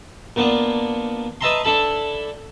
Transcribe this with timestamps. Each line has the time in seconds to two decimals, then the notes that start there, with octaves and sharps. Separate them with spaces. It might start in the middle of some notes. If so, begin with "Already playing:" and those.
0.36 A#2 A#3 B3 D4
1.41 B4 D#5 E5 A5 A#5 C6
1.64 D4 E4 A4 A5 B5